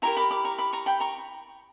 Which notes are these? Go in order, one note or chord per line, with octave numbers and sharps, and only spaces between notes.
E4 G4 A#4 A#5 C#6
B5 D6
B5 D6
A#5 C#6
B5 D6
A#5 C#6
G5 B5
A#5 C#6